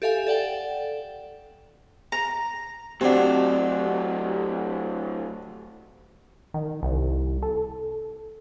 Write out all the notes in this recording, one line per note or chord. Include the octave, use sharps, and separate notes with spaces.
G4 A4 E5 F5 G#5
A4 D5 F#5 G5
A#5
A2 F#3 C4 D4 G4 F#5
D#3
C2
A4